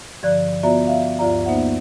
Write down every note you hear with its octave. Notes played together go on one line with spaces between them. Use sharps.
G2 D3 F3 D5 F#6
B3 F4 F#4 D5 E5 A#5
E5 F5
D2 G2 F4 D5 A#5
A#3 B3 D#4 C5 E5 F#5